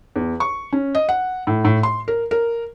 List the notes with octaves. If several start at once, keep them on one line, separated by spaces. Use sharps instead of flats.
E2
C#6
C#4
D#5
F#5
A2
A2
C6
A#4
A#4